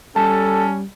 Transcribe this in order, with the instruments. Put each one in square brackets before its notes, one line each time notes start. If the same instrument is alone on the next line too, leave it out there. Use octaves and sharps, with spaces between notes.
[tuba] G3 [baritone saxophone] C#4 [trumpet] A4 [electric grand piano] A5